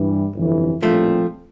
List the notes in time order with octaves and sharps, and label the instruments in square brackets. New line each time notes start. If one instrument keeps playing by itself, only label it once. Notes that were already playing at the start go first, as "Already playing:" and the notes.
Already playing: [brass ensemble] G2 E3 G3
G1 F2 C3 E3
[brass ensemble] A#1 A2 G3 C4 [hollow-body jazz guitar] F3 A3